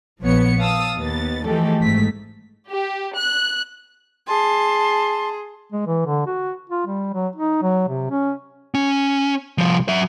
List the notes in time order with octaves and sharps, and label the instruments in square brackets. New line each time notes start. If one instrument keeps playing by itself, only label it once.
[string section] A#1 F3 B3 C#5 C#7
F5 A5 D#6 E6
D#2 B3 A6
E3 F3 G#3 A3 G4 A4
G#1 G#2 A3 B6
[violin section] G4
F#6
[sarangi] G#4 [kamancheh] A5 [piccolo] C6
[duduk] G#3
E3
D3
F#4
F4
G3
F#3
D#4
F#3
C3
C#4
[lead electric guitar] C#4
C2 F3
F#3 E5